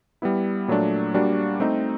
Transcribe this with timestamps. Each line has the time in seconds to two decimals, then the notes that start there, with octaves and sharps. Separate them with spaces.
0.22 G3 B3 E4
0.68 A#2 F#3 A3 D4
1.14 G3 A#3 D4 F#4
1.60 A3 C4 D#4